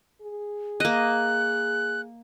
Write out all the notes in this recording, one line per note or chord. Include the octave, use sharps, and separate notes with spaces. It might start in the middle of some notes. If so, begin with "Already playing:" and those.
G#4
A#3 D#5 F#6